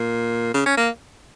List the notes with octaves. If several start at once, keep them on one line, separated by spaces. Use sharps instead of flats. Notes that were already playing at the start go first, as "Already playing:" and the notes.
Already playing: A#2
C#3
C#4
A#3